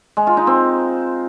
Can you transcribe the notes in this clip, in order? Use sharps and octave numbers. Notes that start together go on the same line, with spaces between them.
G#3
F4
D#4
C4